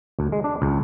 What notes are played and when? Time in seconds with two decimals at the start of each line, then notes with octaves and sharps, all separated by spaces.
0.19 D2
0.32 G#3
0.44 D4
0.62 C#2